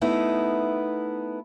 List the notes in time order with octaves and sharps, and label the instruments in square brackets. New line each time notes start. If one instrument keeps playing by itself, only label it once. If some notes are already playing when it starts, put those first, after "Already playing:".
[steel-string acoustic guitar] A3 B3 D#4 E4